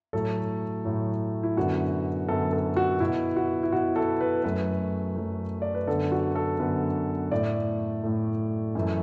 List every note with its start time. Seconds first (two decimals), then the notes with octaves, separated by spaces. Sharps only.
0.13 A2 F#3 A3 A4
0.85 A2 F#3 A3
1.43 E4
1.57 F#2 D3 B3 F#4
2.29 F#2 D3 B3 A4
2.53 A4
2.76 F#4
3.00 B2 B3 E4
3.36 F#4
3.63 E4
3.72 B2 B3 F#4
3.96 A4
4.21 B4
4.44 F#2 F#3 A3 B4
5.16 F#2 F#3 A3
5.62 D5
5.75 B4
5.87 F#2 D3 B3 A4
6.12 F#4
6.36 A4
6.60 F#2 D3 B3 B4
7.31 A2 A3 D5
8.03 A2 A3
8.75 F#2 E3 A3